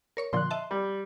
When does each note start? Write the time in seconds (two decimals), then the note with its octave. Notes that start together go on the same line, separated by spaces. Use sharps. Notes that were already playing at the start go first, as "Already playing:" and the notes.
0.17 A#4 C#5 C#6
0.33 A#2 D3 F3 C6 F#6
0.51 D#5 E5 A5
0.71 G3